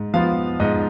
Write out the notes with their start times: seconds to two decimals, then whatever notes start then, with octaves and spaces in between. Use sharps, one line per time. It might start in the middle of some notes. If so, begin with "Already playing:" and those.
Already playing: G#2
0.14 F3 B3 F4 F5
0.60 G#2 D#5